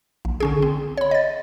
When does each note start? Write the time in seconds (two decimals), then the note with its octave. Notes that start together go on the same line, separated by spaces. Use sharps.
0.25 A#1
0.40 D3 C#4 G#4
0.62 C4
0.97 C#5 B5
1.11 D#5 A6